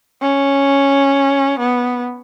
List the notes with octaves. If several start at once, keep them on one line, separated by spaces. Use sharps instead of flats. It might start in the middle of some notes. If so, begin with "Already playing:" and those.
C#4
B3